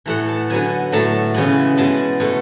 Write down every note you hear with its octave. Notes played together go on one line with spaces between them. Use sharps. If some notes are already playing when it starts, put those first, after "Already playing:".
A2 E3 A3 F#5
A5
D3 F#3 B3 G#5
A2 F#3 A3 A5
C#3 E3 G#3 B3
B2 G#3 B3 A5
B2 A3